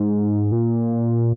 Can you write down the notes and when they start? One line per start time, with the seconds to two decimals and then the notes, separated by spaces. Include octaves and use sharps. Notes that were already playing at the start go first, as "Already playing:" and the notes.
Already playing: G#2
0.52 A#2